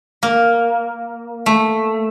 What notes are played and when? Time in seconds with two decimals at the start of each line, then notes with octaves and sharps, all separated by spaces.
0.23 A#3
1.46 A3